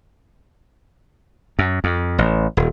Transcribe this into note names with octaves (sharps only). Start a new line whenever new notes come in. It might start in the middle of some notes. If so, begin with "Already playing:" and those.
F#2
F2
A1
D#1